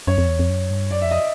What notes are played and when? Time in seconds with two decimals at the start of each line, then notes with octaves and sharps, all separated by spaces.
0.07 F#2 C#5
0.18 F2
0.28 E2
0.39 F2
0.50 F#2
0.70 G2
0.91 F#2 D5
1.02 F2 E5
1.11 D#5